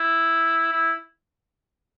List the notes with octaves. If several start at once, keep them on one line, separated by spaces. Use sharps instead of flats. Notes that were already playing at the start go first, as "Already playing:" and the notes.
Already playing: E4
E4